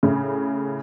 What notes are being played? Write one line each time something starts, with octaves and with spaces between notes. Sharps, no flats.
A2 C#3